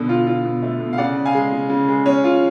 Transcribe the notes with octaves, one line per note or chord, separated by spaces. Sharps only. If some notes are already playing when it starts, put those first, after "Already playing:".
Already playing: B2 D3
F4
F4
B2
A3
B2
F5
C#3 D5 F#5
C#3
F5 G#5
G#3
C#3
C#3
G#3
C#4
F4